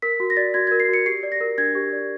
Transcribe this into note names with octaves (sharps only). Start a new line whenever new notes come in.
A#4 B6
F#4
A#6
D5 A6
F#4 G#6
G#6
A#4
C7
F#4 C#7
G4 C7
D5
A#6
A#4
D4 G#6
G4
D5